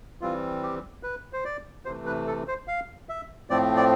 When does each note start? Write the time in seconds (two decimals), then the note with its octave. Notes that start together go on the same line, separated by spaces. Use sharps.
0.21 E3 G3 C4 F4
0.63 G4
1.03 B4
1.33 C5
1.45 D5
1.85 C3 E3 A3 C5
2.06 B4
2.27 A4
2.48 C5
2.68 F5
3.09 E5
3.50 A2 F3 A3 C4 D5
3.77 D5